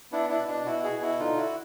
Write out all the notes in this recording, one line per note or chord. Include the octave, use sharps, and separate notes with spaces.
B3 D4 E4
D4 E4
B2
D4
B2 E4 F#4
F#4 G#4
B2
E4 F#4
D3 D#4 F4
E4 F#4